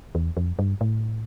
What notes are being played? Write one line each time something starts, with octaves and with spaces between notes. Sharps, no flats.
E2
F2
G2
A2